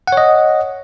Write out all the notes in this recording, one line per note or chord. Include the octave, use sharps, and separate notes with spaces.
C#5 D#5 F#5